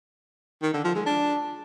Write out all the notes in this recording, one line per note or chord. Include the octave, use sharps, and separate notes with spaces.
D#3
D3
F3
G#3
D4